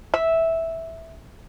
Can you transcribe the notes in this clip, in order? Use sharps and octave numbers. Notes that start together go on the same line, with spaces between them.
E5